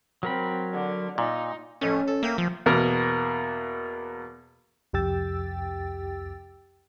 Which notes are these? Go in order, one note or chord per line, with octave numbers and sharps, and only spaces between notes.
F#3 C4 A#4 B5
D3
A#2 D#4
F2 A2 C#4
A4
A#3 E5 G5 G#5
F3
E2 B2 A#3 A#4 A#5
C2 F2 G4 G5 E6 A6